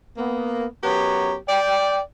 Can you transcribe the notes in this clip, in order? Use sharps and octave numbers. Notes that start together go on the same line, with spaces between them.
A#3 B3
F#2 B3 G4 C#5 A#5
D5 G5